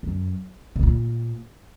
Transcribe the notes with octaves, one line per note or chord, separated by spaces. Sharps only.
F#2
C3
A#2